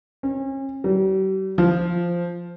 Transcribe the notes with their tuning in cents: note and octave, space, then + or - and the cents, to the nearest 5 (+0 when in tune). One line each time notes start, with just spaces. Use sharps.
C#4 -40
G3 -45
F3 -5